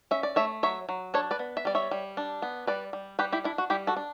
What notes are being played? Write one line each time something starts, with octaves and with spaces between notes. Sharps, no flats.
C#4 E5
D5
A3 C#5 E5
F#3 C#5 E5
F#3
D4 A4 C#5
B4 D5
B3
E5
G3 D5
C#5 E5
G3
D4
B3
G3 B4 D5
G3
G3 G4 B4
E4 G4
D4 E4
F#4
G3 E4 G4
F#4 A4
D4